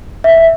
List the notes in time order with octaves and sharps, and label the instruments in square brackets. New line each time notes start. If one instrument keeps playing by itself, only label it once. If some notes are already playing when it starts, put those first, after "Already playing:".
[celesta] E5